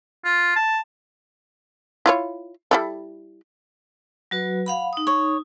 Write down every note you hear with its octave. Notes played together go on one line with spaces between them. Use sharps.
F4
A5
E4 F4 C#5
G3 E4 A4
F#3 F#4 B4
F5 F#5 B5
D#4 D#6
C#5